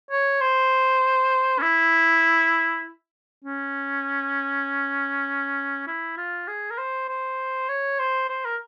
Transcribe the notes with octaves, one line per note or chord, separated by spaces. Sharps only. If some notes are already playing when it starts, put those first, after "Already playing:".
C#5
C5
C#4
E4
C#4
E4
F4
G#4
A#4
C5
C5
C#5
C5
C5
A#4